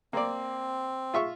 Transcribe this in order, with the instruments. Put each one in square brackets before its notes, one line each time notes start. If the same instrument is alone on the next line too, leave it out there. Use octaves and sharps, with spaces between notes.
[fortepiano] A#3 D5 [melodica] C4
[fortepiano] F4 E5 C#6